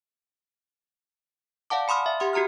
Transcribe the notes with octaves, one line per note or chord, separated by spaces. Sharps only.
D5 F5 F#5 A5 D6
G#5 B5 C6 D#6 F6
E5
G4 F#5 C6 D#6
F#4 G4 A#5 C6 F6